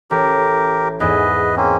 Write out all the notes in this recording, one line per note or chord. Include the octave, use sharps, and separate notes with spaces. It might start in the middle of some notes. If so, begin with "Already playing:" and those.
A1 G4 A#4
E2 G#2 E3 B4 D#5
A#3 C4 C#4